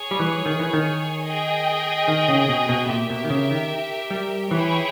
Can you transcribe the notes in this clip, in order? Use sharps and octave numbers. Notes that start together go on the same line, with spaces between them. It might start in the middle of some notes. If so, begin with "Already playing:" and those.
Already playing: G#4 C#5 G#5
G3
E3
D#3
E3
D#3
G#4 D#5 G5
D#3
C#3
B2
B2
A#2 G4 A#4 E5 G5
B2
D#3
C#3
D#3
G3
E3 E4 G#4 C#5 G5